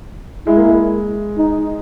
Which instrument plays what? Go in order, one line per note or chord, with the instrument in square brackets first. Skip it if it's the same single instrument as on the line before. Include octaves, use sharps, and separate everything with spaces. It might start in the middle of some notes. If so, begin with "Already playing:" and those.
[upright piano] G#3 [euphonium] E4
[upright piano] A#3
G#3
[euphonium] D#4